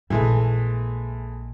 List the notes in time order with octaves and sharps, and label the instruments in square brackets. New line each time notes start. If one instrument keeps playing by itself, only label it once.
[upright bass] A#1 E4 [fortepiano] E3 G#3 A3